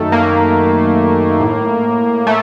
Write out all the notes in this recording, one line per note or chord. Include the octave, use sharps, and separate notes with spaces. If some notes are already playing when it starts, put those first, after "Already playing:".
Already playing: F#2 D#3 A3
A#3
A2
A3